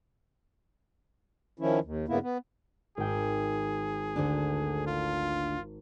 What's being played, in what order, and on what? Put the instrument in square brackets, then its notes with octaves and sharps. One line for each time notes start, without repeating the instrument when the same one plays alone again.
[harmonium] D#3 F3 C#4 E4
D#2
G2 C#3 A#3 B3 E4
B3
[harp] G#1 G5 [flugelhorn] G#4
[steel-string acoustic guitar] D2 D3 D4
[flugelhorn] F4